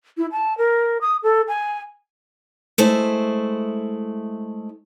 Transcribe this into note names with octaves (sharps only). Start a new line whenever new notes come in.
E4
A5
A#4
D#6
A4
G#5
G#3 A3 E4 C5